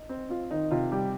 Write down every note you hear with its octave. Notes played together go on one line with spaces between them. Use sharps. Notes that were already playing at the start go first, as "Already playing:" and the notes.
Already playing: D#4
C4
C4 F4
D#3 D#4
C3 F4
G3 G4